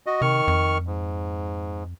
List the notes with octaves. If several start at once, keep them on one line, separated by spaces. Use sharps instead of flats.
F#4 D#5
C3 D#3 C#6 F6
F2
G#2